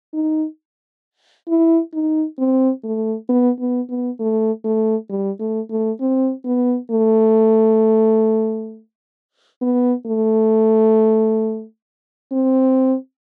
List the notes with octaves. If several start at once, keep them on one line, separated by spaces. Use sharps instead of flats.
D#4
E4
D#4
C4
A3
B3
B3
B3
A3
A3
G3
A3
A3
C4
B3
A3
B3
A3
C4